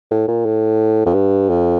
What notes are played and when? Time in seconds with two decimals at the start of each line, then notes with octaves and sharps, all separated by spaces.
0.11 A2
0.28 A#2
0.46 A2
1.06 F2
1.14 G2
1.49 F2